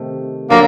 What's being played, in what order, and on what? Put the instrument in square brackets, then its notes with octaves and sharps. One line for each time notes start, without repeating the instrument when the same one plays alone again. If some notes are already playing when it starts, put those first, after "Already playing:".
Already playing: [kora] C3 D#3 A3
[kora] D3 F#3 [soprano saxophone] A#3